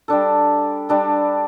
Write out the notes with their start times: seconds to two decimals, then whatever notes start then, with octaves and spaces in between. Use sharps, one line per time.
0.08 G3 D4 A4
0.89 G3 D4 A4